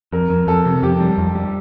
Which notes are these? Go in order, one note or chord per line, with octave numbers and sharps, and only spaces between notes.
F2 A#4
F2
F2 A4
C3
F2 G4
G3
F2
G3